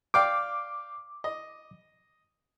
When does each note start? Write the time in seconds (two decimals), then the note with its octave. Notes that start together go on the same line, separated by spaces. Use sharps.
0.14 D5 F5 G5 D6
1.24 D#5